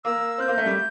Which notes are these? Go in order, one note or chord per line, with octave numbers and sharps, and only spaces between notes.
A#3 E6
C4 G6
A#3
A3
G3